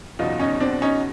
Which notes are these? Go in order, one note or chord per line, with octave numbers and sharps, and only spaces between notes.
F#1 E2 B2 F#3 D#4 F4
C#4 D#4
C4 D4
C#4 D#4